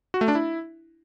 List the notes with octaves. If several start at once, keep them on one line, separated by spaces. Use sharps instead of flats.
F#4
A3
D4
E4